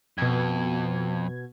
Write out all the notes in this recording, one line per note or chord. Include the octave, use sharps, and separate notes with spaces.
F2 B2 G#6